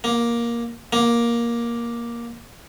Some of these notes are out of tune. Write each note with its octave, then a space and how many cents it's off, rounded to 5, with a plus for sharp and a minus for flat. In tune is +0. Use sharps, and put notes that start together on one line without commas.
A#3 +10
A#3 +10